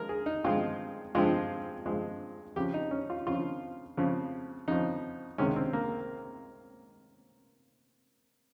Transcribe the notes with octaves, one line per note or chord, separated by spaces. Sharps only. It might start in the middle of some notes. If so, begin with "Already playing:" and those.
Already playing: F3 G#3 A#4
G#4
D#4
G2 F3 G#3 F4
G2 F3 G#3 F4
G2 F3 G#3
F2 C#3 F3 G4
D#4
C#4
F4
F2 C#3 F3 F4
F2 C#3 F3
F2 C#3 F3 D#4
C#2 C3 D#3 G#3 C#4
C4
A#3